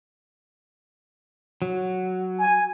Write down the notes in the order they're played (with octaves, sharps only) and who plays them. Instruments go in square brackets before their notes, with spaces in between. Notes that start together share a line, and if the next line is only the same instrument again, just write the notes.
[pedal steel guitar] F#3
[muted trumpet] G#5